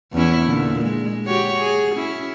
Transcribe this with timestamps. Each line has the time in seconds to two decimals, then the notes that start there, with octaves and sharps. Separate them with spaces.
0.13 E2 C#4 E4
0.45 A#2 D3
0.83 G#3
1.26 F#4 G4 C#5
1.61 G#4
1.95 C#4 E4